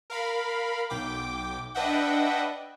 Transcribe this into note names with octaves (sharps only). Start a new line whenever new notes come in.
A#4 F5 B5
B1 G5 D6
D4 B4 D#5 E5 F#5 G5